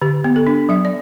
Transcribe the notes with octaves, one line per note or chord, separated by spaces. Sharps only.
D3 G4
B3
A4
D4
F#3 E5
D5